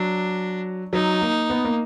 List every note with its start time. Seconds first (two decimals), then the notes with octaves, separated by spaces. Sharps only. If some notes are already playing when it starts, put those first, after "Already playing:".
Already playing: F#3 D4
0.93 F#3 D#4
1.22 A#3
1.50 B3
1.65 A#3